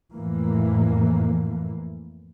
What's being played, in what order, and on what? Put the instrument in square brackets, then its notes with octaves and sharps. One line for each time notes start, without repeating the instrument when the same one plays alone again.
[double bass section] F2 A2 E3 A#3